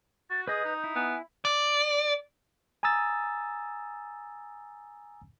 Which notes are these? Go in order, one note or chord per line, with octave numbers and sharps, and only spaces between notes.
F#4 A6
G#4 B4 D#5 D#6 G6
D#4
E4
B3 G#5
D5
G#5 A#5 D#6 E6 A6